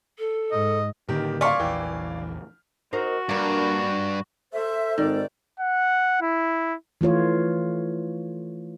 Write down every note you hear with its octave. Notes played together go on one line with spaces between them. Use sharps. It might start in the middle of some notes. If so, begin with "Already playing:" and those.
A4
G#2 D#5
A2 D3 D#3 A#3 G4 A#4
D5 F5 G#5 C6 C#6 F6 B6
A#1 E2 E3 G5
D#4 F#4 A#4 C5
G2 A#3 D4
A4 C5 E5
G#1 D#3 D5
F#5
E4
E3 A3 F4 C#5